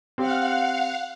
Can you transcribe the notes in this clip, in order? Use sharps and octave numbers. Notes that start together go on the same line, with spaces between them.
C4 G4 F5 F#5